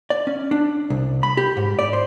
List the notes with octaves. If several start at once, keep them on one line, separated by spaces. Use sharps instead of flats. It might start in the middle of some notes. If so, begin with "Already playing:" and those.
D5
C#4
D4
C2
B5
G4
G#2
D5
C5